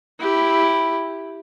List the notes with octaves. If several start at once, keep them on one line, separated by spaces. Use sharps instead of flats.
E4 G4